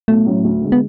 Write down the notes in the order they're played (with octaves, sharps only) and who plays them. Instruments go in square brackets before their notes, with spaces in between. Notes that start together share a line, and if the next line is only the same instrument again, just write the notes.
[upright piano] B1 [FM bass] A3
[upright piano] A2 F#3 C#4
D2
D3 G#3
[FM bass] B3